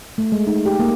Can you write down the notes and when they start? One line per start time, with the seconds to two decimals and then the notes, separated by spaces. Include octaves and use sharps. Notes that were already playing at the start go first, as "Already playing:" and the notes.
0.18 A3
0.32 G#3
0.47 D#4
0.66 G4
0.79 A#3